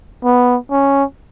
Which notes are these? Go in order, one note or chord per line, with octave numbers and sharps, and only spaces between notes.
B3
C#4